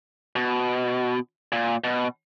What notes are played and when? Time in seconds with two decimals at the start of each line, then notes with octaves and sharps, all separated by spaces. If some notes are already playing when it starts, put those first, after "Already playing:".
0.36 B2
1.52 A#2
1.84 B2